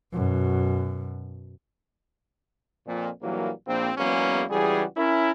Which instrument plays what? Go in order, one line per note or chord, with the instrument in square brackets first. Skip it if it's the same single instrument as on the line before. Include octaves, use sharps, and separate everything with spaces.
[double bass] F#2 B2
[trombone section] F2 A#2
A#1 E3 F#3 G3 A#3
A#1 A#3 C4
E2 F#3 G#3 A#3 B3 C#4
C#2 E3 G3 F#4 G#4
C#4 E4 A#4